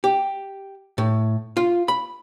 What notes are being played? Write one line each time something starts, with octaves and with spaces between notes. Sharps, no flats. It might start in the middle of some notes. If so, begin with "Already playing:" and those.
G4
A2
F4
B5